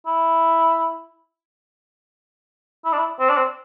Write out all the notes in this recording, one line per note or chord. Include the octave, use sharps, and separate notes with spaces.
E4
E4
D4
E4
C4
D4
C4